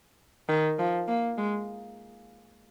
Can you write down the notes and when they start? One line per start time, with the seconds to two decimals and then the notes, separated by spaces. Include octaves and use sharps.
0.49 D#3
0.79 F3
1.08 A#3
1.38 G#3